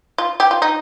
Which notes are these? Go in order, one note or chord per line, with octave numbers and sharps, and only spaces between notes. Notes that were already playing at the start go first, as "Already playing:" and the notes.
F4
G4
F4
D#4